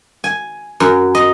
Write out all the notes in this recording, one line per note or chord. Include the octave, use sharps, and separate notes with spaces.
G#5
F#2
D#5